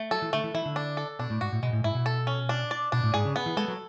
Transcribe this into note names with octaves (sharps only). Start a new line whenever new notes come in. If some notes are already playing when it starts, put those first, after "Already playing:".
Already playing: A3
F#3 A4
E3
D3 A3
E3
E3 E4
D3
D4
A4
B2 D4
A2
G#2 F#4
A2
B2 G#3
A2
G#2 E4
B2
A4
C#4
D4
D5
B2 D4
A2
G#2 G#4
C#3
B3
E3
G#3 A4
F#3